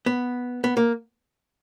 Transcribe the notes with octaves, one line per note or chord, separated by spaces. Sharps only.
B3
B3
A#3